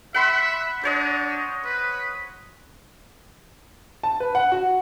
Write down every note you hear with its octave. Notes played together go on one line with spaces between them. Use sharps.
E5 F#5 B5 C6
D4 C5 C#5 D#5
B4
A5
B4
F#5
F#4